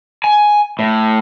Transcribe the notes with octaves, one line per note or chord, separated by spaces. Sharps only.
G#5
A2